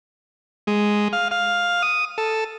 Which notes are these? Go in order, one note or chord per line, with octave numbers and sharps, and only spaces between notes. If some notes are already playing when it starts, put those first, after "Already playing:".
G#3
F5
F5
D#6
A4